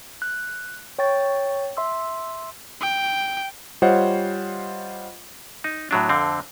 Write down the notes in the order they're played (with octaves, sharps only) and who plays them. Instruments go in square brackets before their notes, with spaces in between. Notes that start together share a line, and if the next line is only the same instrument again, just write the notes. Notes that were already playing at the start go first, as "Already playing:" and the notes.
[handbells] F#6
C#5 G5 C#6 A6
E5 C6 E6
[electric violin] G5
[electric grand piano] G3 F4 C5 C#5 D#5 F#5
[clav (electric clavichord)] D#4
A2 F#3 D4
F2 D3 C4